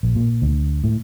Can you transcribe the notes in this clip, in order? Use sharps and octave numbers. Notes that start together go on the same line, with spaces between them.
A#1
A#2
D2
A2